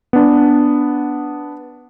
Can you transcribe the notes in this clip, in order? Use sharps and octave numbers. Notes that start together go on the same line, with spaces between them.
B3 D4